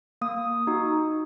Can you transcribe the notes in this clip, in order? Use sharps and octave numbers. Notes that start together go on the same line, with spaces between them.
A#3 D#6
D#4 F#4